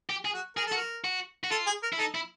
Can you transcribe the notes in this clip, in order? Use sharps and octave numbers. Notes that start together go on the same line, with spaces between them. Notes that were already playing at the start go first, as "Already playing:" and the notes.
G4
G#4
F#4
G#4 A#4
A4
F#4
A#4
F#4
F#4
F4 A4
G#4
A#4
E4
D#4 A4
E4